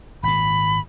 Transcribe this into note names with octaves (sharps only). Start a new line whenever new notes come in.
G#1 A#2 B5